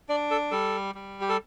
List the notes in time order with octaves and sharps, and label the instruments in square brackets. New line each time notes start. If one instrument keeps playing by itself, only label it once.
[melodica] D4 D5
A4
G3 A4
G3
G4
A4